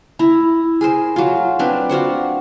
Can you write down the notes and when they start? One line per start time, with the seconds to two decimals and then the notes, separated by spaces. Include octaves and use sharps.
0.19 E4 A#5
0.81 G#4 A#4 C5
1.16 F#3 F4
1.59 F#3 C4 D4 B4
1.89 F4 F#4 C5 F#5